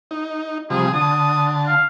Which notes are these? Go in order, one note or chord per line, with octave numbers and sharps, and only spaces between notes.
D#4
C3 F3 G3 G#4
D3 A5 D#6
F5